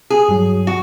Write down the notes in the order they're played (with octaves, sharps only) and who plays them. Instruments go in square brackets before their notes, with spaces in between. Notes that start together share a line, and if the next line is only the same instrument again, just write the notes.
[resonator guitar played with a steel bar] G#4
[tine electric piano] G2 F#3
[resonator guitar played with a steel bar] F#4